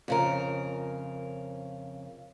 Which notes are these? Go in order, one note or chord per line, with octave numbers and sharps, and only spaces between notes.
F2 C#3 A#4